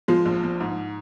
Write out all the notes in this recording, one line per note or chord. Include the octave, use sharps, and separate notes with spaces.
F3 G#3 F4
A#1
F3
G#2